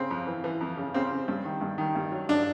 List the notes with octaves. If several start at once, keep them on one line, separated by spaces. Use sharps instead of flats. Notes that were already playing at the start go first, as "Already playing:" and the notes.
Already playing: C#3 C4
F2
E3
E3
F2
C#3
C#3 C4
C#3
G2
D#3
G2
D#3
G2
F#3
F#3 D4